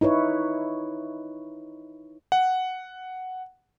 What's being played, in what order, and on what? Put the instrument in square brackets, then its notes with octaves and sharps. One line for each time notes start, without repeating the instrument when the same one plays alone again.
[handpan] D#4 E4 B4 C#5
[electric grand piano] F#5